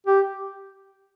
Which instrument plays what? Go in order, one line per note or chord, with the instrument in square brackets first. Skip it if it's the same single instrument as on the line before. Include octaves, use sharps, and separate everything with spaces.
[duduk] G4